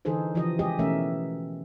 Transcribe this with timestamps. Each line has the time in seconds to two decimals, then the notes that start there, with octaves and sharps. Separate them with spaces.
0.05 D3 E3 D#4 G#4 A4 C5
0.35 C#3 E3 F3 G4 D#5
0.59 G#3 G4 G#4 D#5
0.79 B2 E3 A3 C#4 A#4 E5